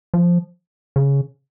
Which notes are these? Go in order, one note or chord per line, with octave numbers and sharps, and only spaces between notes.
F3
C#3